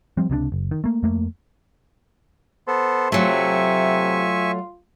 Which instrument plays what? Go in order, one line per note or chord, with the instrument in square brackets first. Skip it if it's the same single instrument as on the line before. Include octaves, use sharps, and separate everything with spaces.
[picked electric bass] F3 G3 C4
C#2 C3 E3 D4
F#1
D#3
A3 A#3
F2 A3 A#3
[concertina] B3 A4 [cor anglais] C5
[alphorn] C3 [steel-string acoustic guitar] F#3 A3 [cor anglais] F4 [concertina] E5 G#5 C#6